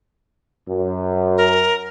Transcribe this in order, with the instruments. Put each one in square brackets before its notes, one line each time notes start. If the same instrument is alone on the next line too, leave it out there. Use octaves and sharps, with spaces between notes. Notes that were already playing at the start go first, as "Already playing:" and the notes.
[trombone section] F#2
[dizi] A#4